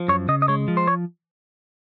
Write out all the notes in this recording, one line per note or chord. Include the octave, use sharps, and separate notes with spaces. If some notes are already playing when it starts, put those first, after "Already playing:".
Already playing: F3
F#2 C#5
C#3 D#5
D#5
G#3 C#5
F3
C5
C#5